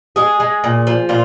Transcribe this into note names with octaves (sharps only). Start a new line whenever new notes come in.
G#3 G#4
G#3
A#2
F3
A#2 F4